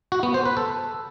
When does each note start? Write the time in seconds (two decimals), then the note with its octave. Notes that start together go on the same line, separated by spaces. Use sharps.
0.12 F#4
0.23 B3
0.34 C5
0.45 B4
0.57 A4